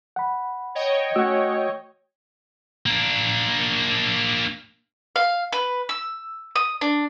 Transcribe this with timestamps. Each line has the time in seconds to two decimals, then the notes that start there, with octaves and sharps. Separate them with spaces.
0.16 F#5 B5
0.75 C#5 D#5 G5
1.16 A3 C#4 F#4 F#5 E6
2.86 A#3 D4
5.16 F5
5.52 B4
5.89 E6
6.56 D#6
6.81 D4